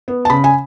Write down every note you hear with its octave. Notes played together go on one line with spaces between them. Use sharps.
B3
A5
C#3 B5
G#5